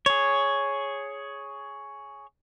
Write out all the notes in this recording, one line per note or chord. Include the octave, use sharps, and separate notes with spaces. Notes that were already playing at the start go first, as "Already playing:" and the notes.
G#4 C#5